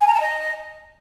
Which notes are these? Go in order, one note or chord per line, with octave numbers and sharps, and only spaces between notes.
G#5
A#5
A5
D#5